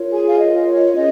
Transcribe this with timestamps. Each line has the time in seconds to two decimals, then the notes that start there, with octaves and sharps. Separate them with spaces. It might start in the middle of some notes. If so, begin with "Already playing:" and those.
Already playing: F4 A#4 C#5
0.10 G#4 G#5
0.28 F5
0.38 F4 A#4 C#5 D#5
0.66 C#5
0.92 C#4 G#4 C#5 D#5